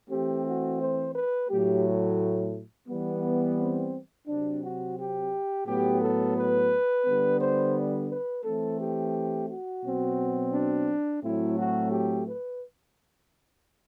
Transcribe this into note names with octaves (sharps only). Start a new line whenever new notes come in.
E3 A3 C4 G4
F#4
C5
B4
A2 F#3 A3 G4
E3 G3 B3
C4
C3 F#3 C4 D4
F#4
G4
A2 F#3 B3 G4
A4
B4
D3 G3 B3
C5
B4
E3 A3 C4 A4
G4
F#4
B2 F#3 C4
D4
A2 F#3 A3 C4 E4
F#4
G4
B4